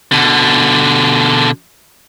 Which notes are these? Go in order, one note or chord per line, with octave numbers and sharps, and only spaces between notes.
B2 D3